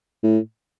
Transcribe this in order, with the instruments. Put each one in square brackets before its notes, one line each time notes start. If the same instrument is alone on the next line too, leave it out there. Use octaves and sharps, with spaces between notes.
[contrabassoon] A2